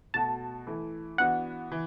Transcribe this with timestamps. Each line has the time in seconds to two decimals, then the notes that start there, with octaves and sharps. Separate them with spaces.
0.14 B2 A3 F#4 A5
0.67 E3 A3 E4
1.18 E3 B3 D4 F#4 F#5
1.72 E3